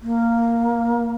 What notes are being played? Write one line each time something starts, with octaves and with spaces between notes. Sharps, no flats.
A#3